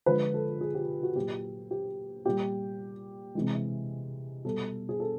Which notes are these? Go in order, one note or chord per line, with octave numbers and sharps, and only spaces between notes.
D3 F3 G#3 B4
A4
G#4
G4
F#4
A#2 F#3 G4
G4
A#2 G3 G4
C3 E3 G#3
B2 G3 A4
G#4
A4